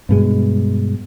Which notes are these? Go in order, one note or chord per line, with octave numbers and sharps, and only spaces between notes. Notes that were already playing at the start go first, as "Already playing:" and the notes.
G2 B2 G#3